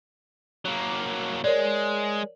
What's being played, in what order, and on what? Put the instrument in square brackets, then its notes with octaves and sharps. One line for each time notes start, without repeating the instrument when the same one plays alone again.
[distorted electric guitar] F#3 A#3
[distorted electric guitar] G#3 [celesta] A#4 C#5 D5